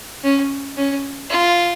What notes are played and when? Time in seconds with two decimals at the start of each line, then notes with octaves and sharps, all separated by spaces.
0.24 C#4
0.77 C#4
1.30 F4